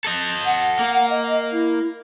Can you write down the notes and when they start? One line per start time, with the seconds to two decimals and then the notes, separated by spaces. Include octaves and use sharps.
0.05 A4 D#5
0.45 F#5
0.79 A#3
1.09 D#5
1.52 E4